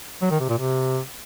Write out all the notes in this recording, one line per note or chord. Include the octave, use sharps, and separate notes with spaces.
F#3
D#3
C3
A#2
C3